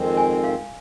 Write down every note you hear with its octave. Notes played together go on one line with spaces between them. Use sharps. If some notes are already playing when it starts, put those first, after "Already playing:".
Already playing: F2 D#3 G#3 C4
G#5
F5